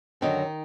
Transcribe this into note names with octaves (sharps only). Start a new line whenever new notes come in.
F#2 D3 D#3 F#3 D#4